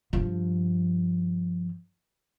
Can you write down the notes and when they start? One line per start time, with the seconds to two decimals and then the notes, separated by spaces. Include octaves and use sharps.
0.13 G2 F3